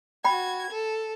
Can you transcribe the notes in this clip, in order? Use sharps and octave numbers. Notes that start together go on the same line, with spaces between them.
F#4 G5 B5 G#6
A4